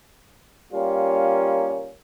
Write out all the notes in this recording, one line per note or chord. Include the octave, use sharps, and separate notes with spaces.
G3 A#3 C#4 F4